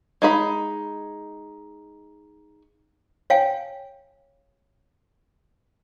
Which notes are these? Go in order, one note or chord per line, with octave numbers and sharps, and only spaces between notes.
G#3 D#4 B5
C#5 F5 G5 G#5